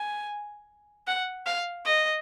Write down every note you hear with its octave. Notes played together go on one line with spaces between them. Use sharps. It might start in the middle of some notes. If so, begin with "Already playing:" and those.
Already playing: G#5
F#5
F5
D#5